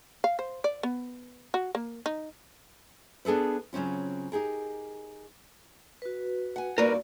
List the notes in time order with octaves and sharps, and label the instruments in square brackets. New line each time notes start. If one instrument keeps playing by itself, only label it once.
[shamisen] F5
C5
D5
B3
F#4
A#3
D#4
[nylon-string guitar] B3 D4 G#4 A4 B4
C#3 F#3 C4 C#4 F4
D#4 G4 G#4 A#4
[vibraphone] F#4 B4
[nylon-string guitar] F#5 G#5
[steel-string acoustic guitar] E2 G2 D5 [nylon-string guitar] A#3 D#4 F#4 [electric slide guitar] A#4 B4